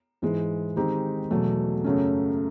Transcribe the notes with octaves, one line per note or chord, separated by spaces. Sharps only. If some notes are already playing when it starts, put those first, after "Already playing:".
G#2 E3 G#3
D#3 G#3 C4 D#4 G4
E2 B2 F#3 A3
F#2 C#3 F#3 A3 C#4